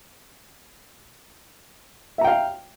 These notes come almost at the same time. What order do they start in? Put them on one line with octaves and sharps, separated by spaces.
E5 A#5 G5 F5